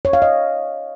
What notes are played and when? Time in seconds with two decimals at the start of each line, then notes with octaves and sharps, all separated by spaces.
0.05 C#5
0.13 F5
0.22 D#5